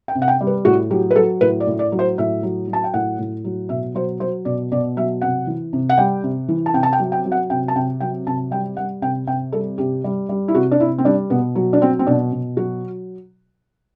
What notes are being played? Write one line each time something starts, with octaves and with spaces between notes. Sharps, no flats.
G5
C3
F#5
G5
G3
B4
A2 F#4
F#3 G4
B4
F#3 A4
A2 B4
D5
A2
D5
F#3
C5
A2 E5
F#3
F#3
A5
G5
A2 F#5
A2
F#3
B2 E5
F#3 C5
F#3 C5
B2 D5
B2 D5
F#3 E5
C3 F#5
E3
C3
F#5
G3 G5
C3
E3
A5
C3 G5
A5
G5
F#3
G5
F#3
F#5
C3 G5
A5
C3 G5
F#3 G5
C3 A5
G3 G5
G3 F#5
C3 G5
C3 G5
G3 A4
C3 G4
G3
G3
E4
C3 F#4
D4
C3 E4
C4
G3 D4
B2 B3
F#3
D4
F#3 C4
C4
B2 D4
B2
F#3 F#4